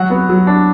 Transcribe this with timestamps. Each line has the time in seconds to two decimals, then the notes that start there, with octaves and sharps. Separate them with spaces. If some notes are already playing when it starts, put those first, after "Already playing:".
Already playing: F#3 F#4 F#5
0.10 B3
0.29 F#3
0.47 D4